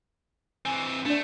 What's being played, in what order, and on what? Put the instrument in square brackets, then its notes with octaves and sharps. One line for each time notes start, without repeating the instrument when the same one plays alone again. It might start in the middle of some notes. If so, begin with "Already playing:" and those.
[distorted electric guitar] E3 C4 [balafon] G#5
[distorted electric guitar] A3 [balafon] D4 D5